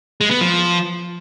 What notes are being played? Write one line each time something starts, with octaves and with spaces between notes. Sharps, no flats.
G#3
B3
F3